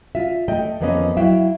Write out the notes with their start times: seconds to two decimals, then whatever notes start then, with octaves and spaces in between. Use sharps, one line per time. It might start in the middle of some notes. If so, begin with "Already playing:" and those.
0.15 F4 E5
0.48 A3 D#5 G5
0.81 F2 F3 A#3 B3 C#4 D#5
1.17 F#3 E4 E5 F5 G5